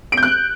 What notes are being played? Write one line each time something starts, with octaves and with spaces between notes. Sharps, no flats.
D7
G6
F#6